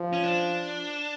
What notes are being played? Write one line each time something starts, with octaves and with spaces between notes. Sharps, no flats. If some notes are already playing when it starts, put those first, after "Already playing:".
Already playing: F3
C#4
D4